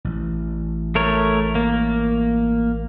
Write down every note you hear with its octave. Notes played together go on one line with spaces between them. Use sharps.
A1
A3 A#4 C#5
A#3